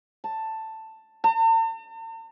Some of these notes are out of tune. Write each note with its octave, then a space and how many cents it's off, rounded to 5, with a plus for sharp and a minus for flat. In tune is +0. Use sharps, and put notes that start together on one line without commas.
A5 +10
A5 +45